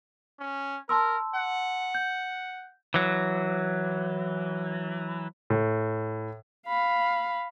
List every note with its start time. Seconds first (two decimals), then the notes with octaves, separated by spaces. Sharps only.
0.39 C#4
0.89 A#4 A5 C6 E6
1.34 F#5
1.95 G6
2.94 E3 F#3
5.50 A2
6.67 F5 B5